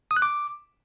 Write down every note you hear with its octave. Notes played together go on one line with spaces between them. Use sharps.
D#6
F#6
D6